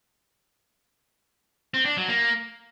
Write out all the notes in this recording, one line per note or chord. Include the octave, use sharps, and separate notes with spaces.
C4
D4
F#3
A#3